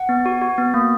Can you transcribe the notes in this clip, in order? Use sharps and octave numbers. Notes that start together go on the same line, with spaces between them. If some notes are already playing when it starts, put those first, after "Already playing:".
Already playing: F#5
B3
F#4
F#4
B3
A#3